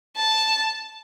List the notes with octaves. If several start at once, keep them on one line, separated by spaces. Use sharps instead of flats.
A5